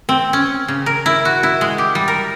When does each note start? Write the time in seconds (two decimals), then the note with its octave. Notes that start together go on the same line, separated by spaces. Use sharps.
0.09 C4
0.33 C#4
0.68 C#3
0.86 A#4
1.06 E4
1.25 F#4
1.43 E4
1.61 G#3
1.78 G4
1.95 G3
2.08 A#4